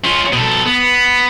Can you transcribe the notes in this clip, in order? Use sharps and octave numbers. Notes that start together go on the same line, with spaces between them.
C#4 F4
B2 A4
B3